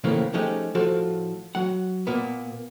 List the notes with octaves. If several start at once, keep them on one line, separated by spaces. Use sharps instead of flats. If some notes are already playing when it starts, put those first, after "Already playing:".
A2 C#3 E3 F3 A3 A#3
F3 G#3 A3 C#4 D#4 G4
A2 F3 F4 F#4 A4
F#3 F#5
A#2 A#3 B3